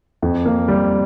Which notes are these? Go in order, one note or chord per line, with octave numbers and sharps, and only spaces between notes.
F2
A#3
G3